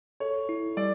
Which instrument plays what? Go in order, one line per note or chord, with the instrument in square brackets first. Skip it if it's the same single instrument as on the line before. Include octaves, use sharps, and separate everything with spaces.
[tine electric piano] A4 [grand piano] C#5
[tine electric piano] E4
[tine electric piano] G3 [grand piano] D5